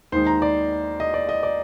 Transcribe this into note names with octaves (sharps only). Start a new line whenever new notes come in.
D#2 D#3 G#3 D#4 C5
A#5
D5
D#5
D5
D#5
D5